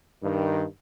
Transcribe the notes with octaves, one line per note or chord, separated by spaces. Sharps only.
G2 D#3